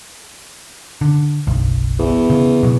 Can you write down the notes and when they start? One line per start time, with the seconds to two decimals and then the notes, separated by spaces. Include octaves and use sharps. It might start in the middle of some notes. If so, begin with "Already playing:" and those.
1.01 D3
1.47 F#1 B1
1.99 E2
2.30 C#3
2.63 B2 F#3